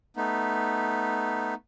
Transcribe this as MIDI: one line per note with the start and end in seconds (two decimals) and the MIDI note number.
0.17 1.54 57
0.17 1.54 59
0.17 1.54 63